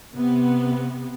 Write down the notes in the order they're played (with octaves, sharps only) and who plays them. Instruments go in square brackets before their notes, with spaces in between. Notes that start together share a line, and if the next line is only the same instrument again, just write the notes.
[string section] C3 B3